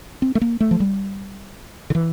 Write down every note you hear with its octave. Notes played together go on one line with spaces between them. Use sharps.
C4
A3
A#3
A3
F3
G3
D3
E3